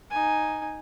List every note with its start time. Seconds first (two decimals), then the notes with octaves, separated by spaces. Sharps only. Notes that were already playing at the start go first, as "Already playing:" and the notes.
0.10 D#4 G#5